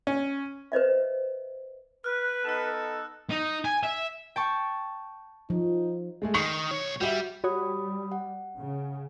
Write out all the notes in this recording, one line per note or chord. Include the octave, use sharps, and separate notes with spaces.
C#4
B4 C5 D#5 E5
B4 F6 F#6
B3 D#4 A4 E6 E7
D#4
G#5
E5
G5 A5 C#6
F3 D#4
G#3 A3 G#4
D#3 C#6 C7 C#7
B1 C#5
G3 F#4 E5
G3 F#4 G4 C#5 B5 D#6
F#5
C#3